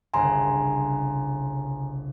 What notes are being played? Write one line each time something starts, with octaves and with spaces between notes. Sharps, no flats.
G1 C2 C#3 G#5 A#5 C6